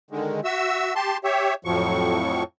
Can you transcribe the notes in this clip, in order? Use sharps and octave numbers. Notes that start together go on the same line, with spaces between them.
D3 D#3 G#3
F#4 E5 E6
G4 A5 C6
G4 C#5 E5
F2 A2 F3 F#3 C#6